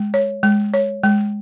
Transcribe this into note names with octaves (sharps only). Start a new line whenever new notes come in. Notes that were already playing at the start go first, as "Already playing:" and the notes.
Already playing: G#3
C#5
G#3
C#5
G#3